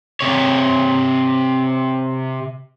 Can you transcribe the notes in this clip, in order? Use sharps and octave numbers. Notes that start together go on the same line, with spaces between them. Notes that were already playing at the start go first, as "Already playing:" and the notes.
C3 C#5